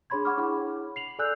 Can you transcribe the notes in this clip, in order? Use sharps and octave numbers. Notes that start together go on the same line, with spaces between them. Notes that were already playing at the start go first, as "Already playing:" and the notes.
D4 G#4 C#5 B5 C6 G#6
F#5 B5 C#6 D6 F6
D4 E4 G#4 C#5 F#5 B5
C7 F7 F#7
A4 D5 G#5 E6 F#6 G6